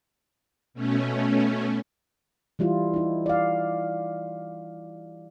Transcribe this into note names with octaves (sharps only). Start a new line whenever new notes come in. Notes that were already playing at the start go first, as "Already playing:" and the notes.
B2 A3 C#4
E3 G3 E4 F4
D#4 E4
D5 F5